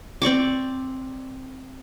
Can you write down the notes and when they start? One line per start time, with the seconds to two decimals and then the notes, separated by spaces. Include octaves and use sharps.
0.22 C4 D5 C#6 D6